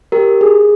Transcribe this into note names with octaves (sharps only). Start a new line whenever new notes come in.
G4 A#4
G#4